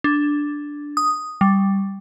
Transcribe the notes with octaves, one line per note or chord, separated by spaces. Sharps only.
D4
D#6
G3